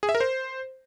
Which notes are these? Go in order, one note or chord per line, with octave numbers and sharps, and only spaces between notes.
G#4
E5
A#4
C5